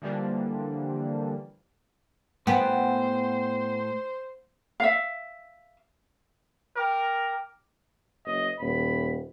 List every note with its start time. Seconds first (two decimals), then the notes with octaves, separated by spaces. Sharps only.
0.02 D3 E3 F3 G3 A#3 D4
2.47 A2 B3 C5 G5 G#5
4.80 E5 F5
6.76 A#4 G5 D6 F6
8.26 F#1 D#5
8.60 D#1 B5